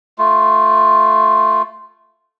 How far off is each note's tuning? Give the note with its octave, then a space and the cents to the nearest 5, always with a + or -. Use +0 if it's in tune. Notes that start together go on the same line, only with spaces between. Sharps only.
A3 +0 F4 +0